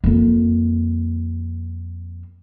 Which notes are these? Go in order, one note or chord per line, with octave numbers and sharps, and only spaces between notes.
F2 A#3